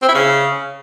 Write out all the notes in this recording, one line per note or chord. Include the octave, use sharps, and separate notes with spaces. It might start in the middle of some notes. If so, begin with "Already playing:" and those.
C4
E4
C#3